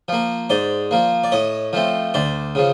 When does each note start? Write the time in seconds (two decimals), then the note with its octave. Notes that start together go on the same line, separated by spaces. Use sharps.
0.08 F3 A#3
0.50 G#2 C5 D5
0.91 F3 A#3
1.24 D5
1.32 A2 C#5 D#5
1.73 F3 A3 C4
2.14 D2 C5 D5
2.55 C#3 F3